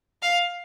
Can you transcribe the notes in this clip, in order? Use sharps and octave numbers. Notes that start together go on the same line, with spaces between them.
F5